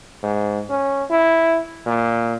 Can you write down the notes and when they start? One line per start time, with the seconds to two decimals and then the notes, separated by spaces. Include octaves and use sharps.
0.23 G#2
0.69 C#4
1.10 E4
1.86 A#2